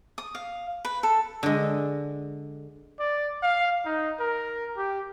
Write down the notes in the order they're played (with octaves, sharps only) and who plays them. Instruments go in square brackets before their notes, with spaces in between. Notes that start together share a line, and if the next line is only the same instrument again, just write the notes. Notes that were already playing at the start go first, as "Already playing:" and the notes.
[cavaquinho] D#6
F5
B4
A4
[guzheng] D3 G#3
[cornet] D5
F5
D#4
A#4
G4